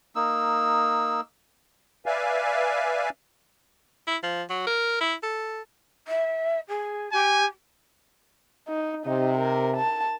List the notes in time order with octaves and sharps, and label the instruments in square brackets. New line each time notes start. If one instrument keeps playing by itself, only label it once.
[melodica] A#3 D#4 E6
[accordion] B4 D5 E5 F5 G#5
[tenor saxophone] E4
F3
F#3
A#4
E4
A4
[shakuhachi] E5
G#4
[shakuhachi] G4 [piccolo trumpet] G#5
[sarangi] D#4
[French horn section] C3 [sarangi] D#4
[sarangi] A#4
A5